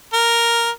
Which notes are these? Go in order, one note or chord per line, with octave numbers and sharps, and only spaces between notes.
A#4